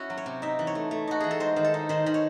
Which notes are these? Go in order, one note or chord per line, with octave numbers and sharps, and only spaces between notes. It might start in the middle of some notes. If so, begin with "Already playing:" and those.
Already playing: C#4 E4 F#4
F#3
C#5
C3
D#4 E5
E3
C#5
A3
A3
D#4 F#4
E3 G#4
A4
G#3 C5
D#3
A4
D#4
D#3 C5
D#3
C#5